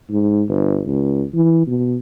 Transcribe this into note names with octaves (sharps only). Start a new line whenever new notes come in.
G#2
G1
C#2
E3
B2